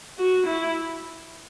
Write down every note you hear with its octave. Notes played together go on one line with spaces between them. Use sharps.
F#4
E4